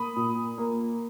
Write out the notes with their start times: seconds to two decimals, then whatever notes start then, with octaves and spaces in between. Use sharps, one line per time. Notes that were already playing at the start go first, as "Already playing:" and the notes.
Already playing: A#3 B5 D#6
0.16 A#2
0.58 A#3